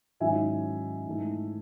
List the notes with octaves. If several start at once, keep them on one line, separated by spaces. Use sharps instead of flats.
G#2 D#3 F#3 C#4 E4 E5 G#5
G#2 E3 A3